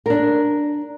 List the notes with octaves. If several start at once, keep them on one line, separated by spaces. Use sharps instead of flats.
D4 A#4